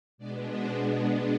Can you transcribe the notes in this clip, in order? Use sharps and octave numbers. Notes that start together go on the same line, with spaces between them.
B2 G#3 B3 D4 D5
C5